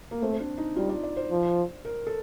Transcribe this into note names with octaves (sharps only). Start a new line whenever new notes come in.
A#3
A3 C4
C4
D4
D#4
G3 F4
D5
D5
C5
F3
A#4
A4